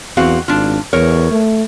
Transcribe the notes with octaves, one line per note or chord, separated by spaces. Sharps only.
E2 C4 F#4 F5
G#1 D4 F4
E2 A#4 C#5
A3